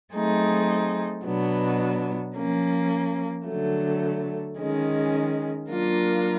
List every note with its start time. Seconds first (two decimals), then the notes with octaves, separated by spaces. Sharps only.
0.13 F#3 A3 C4 D#4 G#4
1.24 B2 F#3 B3 D4
2.35 F3 A#3 C#4
3.46 D3 F#3 A3
4.58 D#3 G#3 C#4
5.69 F#3 A#3 D4 F4 A#4